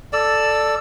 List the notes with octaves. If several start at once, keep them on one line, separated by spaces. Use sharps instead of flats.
A4 D5 E6